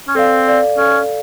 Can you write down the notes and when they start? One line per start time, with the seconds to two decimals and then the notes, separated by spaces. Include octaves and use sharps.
0.08 C#4
0.15 C4 A4 D5 F5
0.46 A4 D5 F5
0.77 C#4 A4 D5 F5